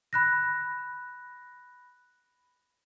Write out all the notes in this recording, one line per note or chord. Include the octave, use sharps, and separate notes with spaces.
B5 F#6 A#6